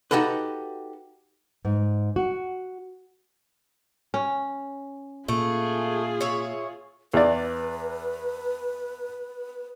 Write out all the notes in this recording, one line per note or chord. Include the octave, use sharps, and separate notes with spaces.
D#4 F#4 G4 A4 B4
G#2
F#4
C#4
A#2 A3 F4 G#4
C#5 E5
E2 B4 D5